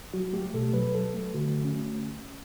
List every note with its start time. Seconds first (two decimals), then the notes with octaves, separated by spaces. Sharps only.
0.14 F#3 F#4
0.33 A3 G4
0.54 B2 A4
0.73 F#3 B4
0.95 F#3 A4
1.14 A3
1.34 D3 F#4
1.55 A3
1.64 C#4